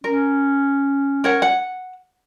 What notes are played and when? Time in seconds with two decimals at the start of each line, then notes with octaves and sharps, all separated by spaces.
0.04 C#4 A#4
1.24 A#4 C#5 F#5
1.42 F#5